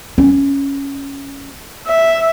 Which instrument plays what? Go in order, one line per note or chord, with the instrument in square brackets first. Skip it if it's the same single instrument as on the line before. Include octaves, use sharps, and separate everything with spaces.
[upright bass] C#4
[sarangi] E5